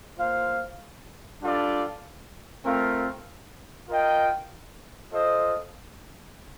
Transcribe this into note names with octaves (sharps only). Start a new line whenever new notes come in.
A#3 F4 C5 F5
G3 D4 F4 A4 D5
A3 C4 F4 A#4 F5
F4 A#4 D#5 G5
F4 A4 C5 D#5